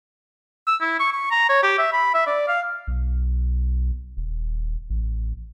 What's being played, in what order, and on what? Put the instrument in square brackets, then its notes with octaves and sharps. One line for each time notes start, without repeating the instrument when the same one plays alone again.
[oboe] E6
E4
C#6
C#6
A#5
C#5
G4
E5
B5
E5
D5
F5
[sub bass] B1
D#1
A1